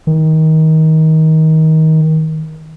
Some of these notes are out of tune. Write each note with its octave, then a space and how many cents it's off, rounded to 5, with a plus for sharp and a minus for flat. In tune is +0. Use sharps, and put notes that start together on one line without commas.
D#3 +25